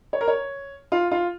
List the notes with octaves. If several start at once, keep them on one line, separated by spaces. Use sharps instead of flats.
C#5
A#4
C#5
F4
F4